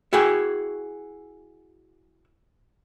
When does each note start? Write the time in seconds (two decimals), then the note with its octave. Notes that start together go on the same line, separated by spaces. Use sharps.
0.13 E4 F#4 G#4 G5